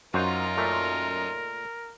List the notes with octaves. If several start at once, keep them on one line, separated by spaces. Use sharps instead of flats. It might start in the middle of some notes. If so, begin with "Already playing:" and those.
F#2 D#4 F4 F#4 A#4 C5
A#2 A3